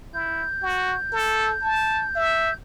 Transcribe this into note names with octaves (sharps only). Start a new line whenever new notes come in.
E4 G6
F#4
A4
A5
E5